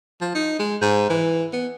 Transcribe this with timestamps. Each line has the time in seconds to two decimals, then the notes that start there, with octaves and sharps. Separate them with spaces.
0.21 F3
0.35 D#4
0.59 G#3
0.81 G#2
1.10 E3
1.53 B3